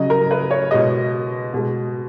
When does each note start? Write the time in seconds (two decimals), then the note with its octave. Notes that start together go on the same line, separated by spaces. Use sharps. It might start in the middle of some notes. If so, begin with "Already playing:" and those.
Already playing: C#3 F#3 D#5
0.10 A#4
0.31 B4
0.51 C#5
0.71 B2 G#3 D#5
1.53 B2 G#3